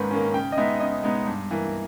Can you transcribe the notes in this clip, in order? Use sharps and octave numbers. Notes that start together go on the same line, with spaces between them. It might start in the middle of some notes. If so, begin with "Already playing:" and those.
Already playing: G#2 D#3 A#3 C#4 B4
D#3 A#3 C#4
C#3 G5
D#5
G#3 B3 D#4 E5
C#3 D#5
G#3 B3 D#4
G2
E3 A#3